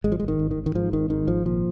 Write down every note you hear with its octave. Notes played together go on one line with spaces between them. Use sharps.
G#1 G#3
F3
G#1 G#3
D#3
G#1
D#3
G#1
D#3
G#2 F3
G#1 D#3
G#2 D#3
G#1 F3
A#2 F3